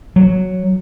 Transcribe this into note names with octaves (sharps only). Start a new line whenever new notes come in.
F#3